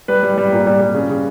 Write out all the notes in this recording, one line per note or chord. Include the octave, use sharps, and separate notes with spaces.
G3 B4
G3
G3
A#2
G3
G3
C#3
C#3